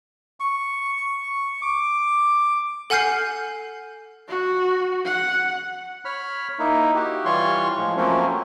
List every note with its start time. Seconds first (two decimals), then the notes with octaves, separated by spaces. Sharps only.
0.40 C#6
1.62 D6
2.90 A4 F#5 G#5 F6 G6 C7
4.28 F#4
5.05 F#5
6.05 C#5 B5 F6
6.59 A#3 D#4 E4
6.95 F#4 G4
7.25 E3 G3 F4 C#5 C6 C#6
7.77 A2 F3 G#3
7.97 F3 F#3 A3 A#3 C4 C#4